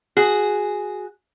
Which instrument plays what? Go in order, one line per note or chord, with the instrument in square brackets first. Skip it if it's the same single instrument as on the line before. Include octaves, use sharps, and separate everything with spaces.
[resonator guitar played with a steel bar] F#4 G#4